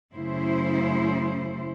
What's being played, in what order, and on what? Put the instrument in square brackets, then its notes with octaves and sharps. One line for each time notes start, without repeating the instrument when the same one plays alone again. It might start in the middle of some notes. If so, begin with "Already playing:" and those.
[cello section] F#2 C#3 A3 E4 C5